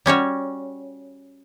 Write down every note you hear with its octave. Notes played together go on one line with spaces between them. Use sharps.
G3 C#4 F#4 C#5